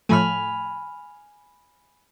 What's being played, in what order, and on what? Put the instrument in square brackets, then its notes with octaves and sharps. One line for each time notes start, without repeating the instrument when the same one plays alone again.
[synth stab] A2 F3 A3 [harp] G#5 B5 F6